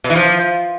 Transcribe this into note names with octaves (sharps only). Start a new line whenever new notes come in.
B2
E3
F3